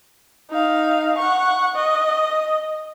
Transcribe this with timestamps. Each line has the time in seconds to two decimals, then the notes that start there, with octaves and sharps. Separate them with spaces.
0.50 D#4 F5
1.18 F#5 C#6
1.76 D#5